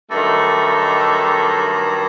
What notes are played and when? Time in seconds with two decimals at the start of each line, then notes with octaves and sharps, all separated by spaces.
0.10 G2 D#3 F#3 A3